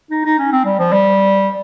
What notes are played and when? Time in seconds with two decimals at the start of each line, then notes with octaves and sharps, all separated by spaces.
0.11 D#4
0.25 D#4
0.39 C#4
0.53 C4
0.65 G3
0.80 F3
0.93 G3